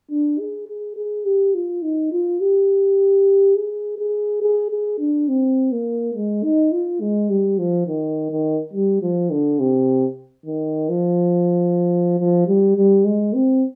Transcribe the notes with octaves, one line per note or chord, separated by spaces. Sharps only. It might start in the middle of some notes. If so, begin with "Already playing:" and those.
D4
G#4
G#4
G#4
G4
F4
D#4
F4
G4
G#4
G#4
G#4
G#4
D4
C4
A#3
G#3
D#4
F4
G#3
G3
F3
D#3
D#3
G3
F3
D3
C3
D#3
F3
F3
G3
G3
G#3
C4